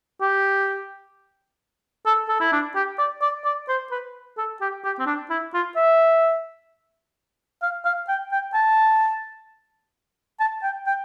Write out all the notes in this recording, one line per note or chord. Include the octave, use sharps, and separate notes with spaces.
G4
A4
A4
E4
D4
G4
D5
D5
D5
C5
B4
A4
G4
G4
C4
D4
E4
F4
E5
F5
F5
G5
G5
A5
A5
G5
G5